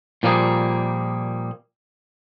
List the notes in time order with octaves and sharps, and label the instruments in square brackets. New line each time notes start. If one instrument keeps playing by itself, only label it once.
[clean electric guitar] A#2 F3 G3 A#3 G#4